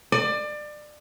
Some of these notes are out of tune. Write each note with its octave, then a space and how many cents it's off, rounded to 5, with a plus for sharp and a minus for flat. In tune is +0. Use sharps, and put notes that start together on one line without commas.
D5 +25